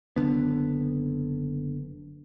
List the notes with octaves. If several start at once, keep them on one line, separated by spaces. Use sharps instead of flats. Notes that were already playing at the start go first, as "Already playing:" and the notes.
F#1 E2 D3 B3